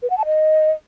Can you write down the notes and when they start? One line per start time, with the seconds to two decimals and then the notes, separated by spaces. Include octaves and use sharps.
0.02 B4
0.10 F#5
0.18 A5
0.25 D#5